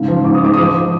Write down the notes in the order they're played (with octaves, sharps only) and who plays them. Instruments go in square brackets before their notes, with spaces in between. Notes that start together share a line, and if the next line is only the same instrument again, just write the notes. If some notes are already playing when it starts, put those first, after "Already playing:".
Already playing: [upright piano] G#2 C#3
F3
G#2 D6
D#6
G#3 D6
F3 D#6
D6